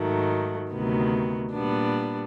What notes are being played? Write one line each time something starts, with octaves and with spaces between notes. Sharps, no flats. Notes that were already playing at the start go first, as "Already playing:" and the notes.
Already playing: G#2 D#3 F#3 A3
D2 C3 D#3 F#3 B3
A#2 G3 B3 D4